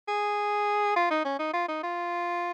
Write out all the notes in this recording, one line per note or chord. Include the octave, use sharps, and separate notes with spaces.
G#4
F4
D#4
C#4
D#4
F4
D#4
F4